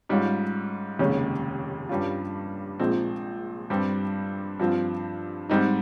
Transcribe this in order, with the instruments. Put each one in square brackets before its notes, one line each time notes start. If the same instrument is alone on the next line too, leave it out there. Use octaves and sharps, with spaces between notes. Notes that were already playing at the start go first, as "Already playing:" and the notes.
[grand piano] G#2 G3 C#4 F4
F1 D#2 C#3 G#3 C#4
G2 G3 C#4 F4
A#1 A#2 F3 G#3 C4
G2 G3 C4
G2 F3 C4 F4
G#2 G3 C4 D#4